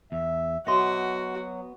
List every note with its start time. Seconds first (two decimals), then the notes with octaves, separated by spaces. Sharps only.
0.12 E2 E5
0.67 F#3 B3 F#4 D#5 E5 C6